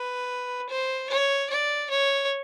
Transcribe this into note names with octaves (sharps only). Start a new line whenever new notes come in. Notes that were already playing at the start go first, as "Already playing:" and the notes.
Already playing: B4
C5
C#5
D5
C#5